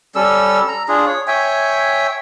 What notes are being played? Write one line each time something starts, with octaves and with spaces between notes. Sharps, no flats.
G3 C#4 A4 E6
A#5
D4 F4 G#4
C#5
C#5 E5 G5 G#5